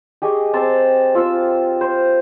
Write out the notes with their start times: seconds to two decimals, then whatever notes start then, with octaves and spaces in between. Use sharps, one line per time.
0.22 G4 G#4 D#5 C#6
0.54 C4 A5 C6
1.15 C4 F4 E6
1.81 C5